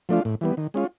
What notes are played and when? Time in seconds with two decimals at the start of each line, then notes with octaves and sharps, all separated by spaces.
0.09 F3 A3 D4 F4
0.25 A2
0.41 E3 G3 B3
0.57 D#3
0.74 G#3 C#4 F4